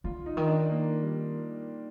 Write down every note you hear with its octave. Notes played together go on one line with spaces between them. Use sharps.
D3 F4
D#4
D#3
D4
A#3
G3